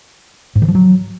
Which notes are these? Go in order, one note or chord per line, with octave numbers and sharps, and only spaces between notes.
G#2
D#3
F3
F#3